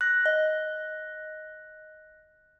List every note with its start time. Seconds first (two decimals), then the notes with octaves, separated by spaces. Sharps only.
0.01 F#6 A#6
0.26 D#5